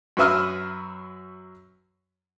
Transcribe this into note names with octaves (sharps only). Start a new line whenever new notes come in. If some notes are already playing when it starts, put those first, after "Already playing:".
F#2 F#3 B4 E5 D#6 F6